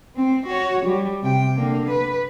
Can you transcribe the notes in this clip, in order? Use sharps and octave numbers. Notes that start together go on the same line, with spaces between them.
C4
F#4 C#5
G3
C3 G5
D3 A#3
B4